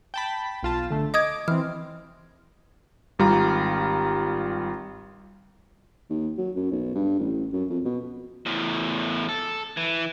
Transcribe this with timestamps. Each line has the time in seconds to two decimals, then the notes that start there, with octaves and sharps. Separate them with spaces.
0.14 G5 A5 B5
0.63 B1 F4 A5
0.91 D3 A3
1.14 D#5 D6 D#6 G#6
1.48 E3 C4 F6
3.19 G#1 G3 F4 A#5
6.10 D#2
6.38 F#3
6.56 F#2
6.71 B1
6.95 G2
7.19 A1
7.53 F#2
7.70 F2
7.85 B2
8.46 E2 A2
9.29 A4
9.77 E3